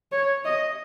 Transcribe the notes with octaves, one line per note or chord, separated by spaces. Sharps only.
C#5
D#5